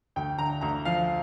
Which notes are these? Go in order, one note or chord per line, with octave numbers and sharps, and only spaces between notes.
D2 G5
D3 A#5
D2 A#5
F3 F5